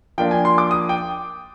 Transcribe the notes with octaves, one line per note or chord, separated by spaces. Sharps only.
F3 A#3 D4 G5
G#5
C6
D6
D#6
G5